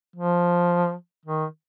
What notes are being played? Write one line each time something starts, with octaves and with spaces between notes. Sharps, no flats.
F3
D#3